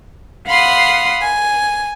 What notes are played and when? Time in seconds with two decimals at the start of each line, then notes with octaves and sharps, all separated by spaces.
0.47 F5 F#5 B5 C6 D#6
1.22 G#5